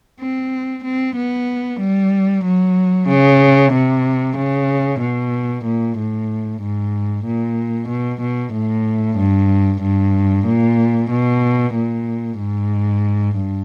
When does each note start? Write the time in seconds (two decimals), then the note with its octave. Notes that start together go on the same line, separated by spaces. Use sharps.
0.19 C4
0.83 C4
1.15 B3
1.80 G3
2.44 F#3
3.08 C#3
3.72 C3
4.36 C#3
5.00 B2
5.64 A#2
5.96 A2
6.61 G#2
7.25 A#2
7.89 B2
8.21 B2
8.53 A2
9.17 G2
9.81 G2
10.45 A#2
11.09 B2
11.74 A#2
12.37 G#2
13.34 G2